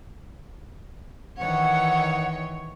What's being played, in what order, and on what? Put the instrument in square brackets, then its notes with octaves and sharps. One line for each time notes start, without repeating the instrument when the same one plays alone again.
[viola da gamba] D#3 E3 C#5 [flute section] F#5